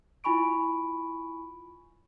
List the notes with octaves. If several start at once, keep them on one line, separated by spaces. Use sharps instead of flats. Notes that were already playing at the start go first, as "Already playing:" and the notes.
E4 F4 G#5 B5 C#6 D7